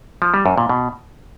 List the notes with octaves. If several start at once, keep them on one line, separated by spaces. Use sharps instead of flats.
F3
G3
F#2
A#2
B2